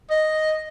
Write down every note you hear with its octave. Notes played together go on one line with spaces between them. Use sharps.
D#5